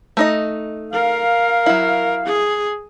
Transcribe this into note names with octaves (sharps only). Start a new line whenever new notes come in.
A3 D#4 D#5
A#4 F5
F#3 E4
G#4